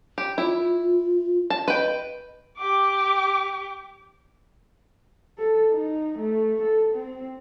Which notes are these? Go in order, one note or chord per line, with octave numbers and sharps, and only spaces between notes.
G4
E4 F4
A5
B4 D#5 G5
G4 D6
A4
D#4
A3
A4
C4